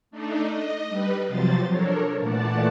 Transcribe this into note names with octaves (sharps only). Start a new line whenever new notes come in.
A3 D4 D#4
D#5
G3 B4
C3 F3 F#3 C5 A6
D4 A4 A#4 C#5
A#2 E3 A3 D5 F#5 A5